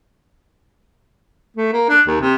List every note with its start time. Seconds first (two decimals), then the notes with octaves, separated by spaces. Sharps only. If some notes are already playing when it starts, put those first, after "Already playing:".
1.57 A3
1.73 A#3
1.89 D4
2.07 D#2
2.21 C3